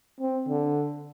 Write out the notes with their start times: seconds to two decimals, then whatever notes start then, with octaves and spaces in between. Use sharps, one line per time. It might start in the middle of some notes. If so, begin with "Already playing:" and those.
0.21 C4
0.48 D3